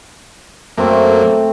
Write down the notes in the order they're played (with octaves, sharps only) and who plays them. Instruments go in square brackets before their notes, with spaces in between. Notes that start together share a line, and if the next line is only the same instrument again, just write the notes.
[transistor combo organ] F#2 A#3 [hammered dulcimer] A3 C4